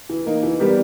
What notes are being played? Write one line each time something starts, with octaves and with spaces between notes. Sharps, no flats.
E3
A#3 D#4
E3
G3 B3 G4 A#4